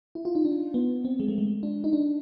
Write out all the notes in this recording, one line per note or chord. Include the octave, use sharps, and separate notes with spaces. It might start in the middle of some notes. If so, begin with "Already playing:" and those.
E4
F4
D#4
D4
B3
C4
G#3
A3
G#3
D4
D#4
D4